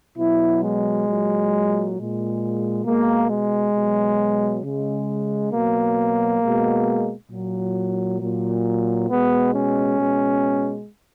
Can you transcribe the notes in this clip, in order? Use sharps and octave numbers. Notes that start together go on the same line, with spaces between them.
B2 F#3 E4
G#3
A#2 F#3
A#2 G#3
B2 G#3 A#3
G#3
B2 F#3
C#3 G#3
B2 F#3 A#3
B2 G#3
A#2 F#3
A#2 F#3
B2 G#3 B3
C#4
B2 G#3